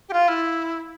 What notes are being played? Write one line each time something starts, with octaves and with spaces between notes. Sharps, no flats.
G4
F4
E4